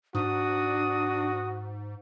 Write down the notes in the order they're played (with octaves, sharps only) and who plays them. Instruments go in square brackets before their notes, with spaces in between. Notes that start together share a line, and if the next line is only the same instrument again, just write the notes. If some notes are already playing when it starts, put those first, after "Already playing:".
[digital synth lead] G#2 [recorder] D4 [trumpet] F#4 [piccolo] D#6